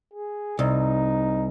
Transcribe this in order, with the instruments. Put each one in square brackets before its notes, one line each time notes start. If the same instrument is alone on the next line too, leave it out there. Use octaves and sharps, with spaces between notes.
[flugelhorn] G#4
[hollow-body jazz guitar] C2 [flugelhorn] D#4